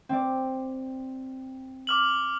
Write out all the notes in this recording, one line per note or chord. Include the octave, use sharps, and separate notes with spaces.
C4 D5
D6 F6 F#7